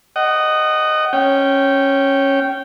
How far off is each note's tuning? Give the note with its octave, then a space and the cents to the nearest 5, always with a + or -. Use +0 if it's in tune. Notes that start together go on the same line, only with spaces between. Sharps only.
D#5 -10 F#5 +25
C#4 -10 G5 -15